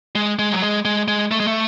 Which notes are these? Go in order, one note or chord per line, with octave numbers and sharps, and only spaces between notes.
G#3
G#3
F#3
G#3
G#3
G#3
A3
G#3
A3